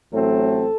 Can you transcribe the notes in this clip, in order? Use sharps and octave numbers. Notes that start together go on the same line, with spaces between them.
A1 A2 F#3 C4 A4